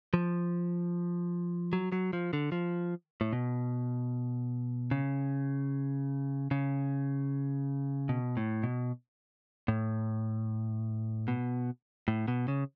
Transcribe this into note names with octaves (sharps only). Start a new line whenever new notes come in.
F3
F#3
F#3
F3
D3
F3
A2
B2
C#3
C#3
B2
A2
B2
A2
B2
A2
B2
C#3